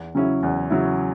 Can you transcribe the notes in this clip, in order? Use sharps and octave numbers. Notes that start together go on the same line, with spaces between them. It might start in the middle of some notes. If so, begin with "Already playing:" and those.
Already playing: E2
C#3 F#3 C#4 E4
E2
C#3 F#3 C#4 E4